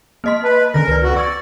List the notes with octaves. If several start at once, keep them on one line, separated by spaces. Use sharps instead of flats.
A#3 D#5 C6 F6 B6
B4 A5
D3 D#3 A#4 A#6
C#2 D#3 B4 D5
F2 F#4
D5 C#6 E6 G#6 C#7